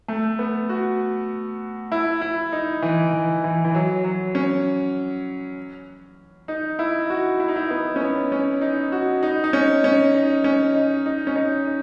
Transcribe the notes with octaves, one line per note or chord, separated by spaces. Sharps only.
A3
B3
F#4
E4
E4
D#4
E3
E3
E3
E3
F#3
F#3
C#4
D#4
E4
F#4
E4
D#4
E4
B3
C#4
B3
C#4
D#4
F#4
D#4
D#4
C#4
C#4
D#4
C#4
D#4
D#4
C#4
D#4
D#4